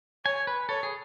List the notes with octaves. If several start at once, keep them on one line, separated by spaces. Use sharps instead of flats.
C#5 G#5
B4
A4 C#5
G#4